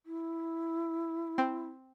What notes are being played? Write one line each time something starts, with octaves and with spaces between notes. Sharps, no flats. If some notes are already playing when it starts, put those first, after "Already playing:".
E4
C4